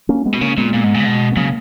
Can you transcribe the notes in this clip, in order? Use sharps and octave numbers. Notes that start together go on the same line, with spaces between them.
A#3 C#4
G#3 B3
B2
C#3 A#3 C#4
A#2 G#3 B3
A#2
G#2
A#2
C#3
B2
B3
C#3 F#3 A#3